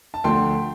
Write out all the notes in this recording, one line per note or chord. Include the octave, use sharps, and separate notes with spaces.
A5
D2 D3 F3 A3 G5 C6